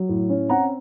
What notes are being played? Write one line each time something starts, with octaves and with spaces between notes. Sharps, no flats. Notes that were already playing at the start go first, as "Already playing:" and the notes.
Already playing: F#3
A2
C#4
C4 F#5 A#5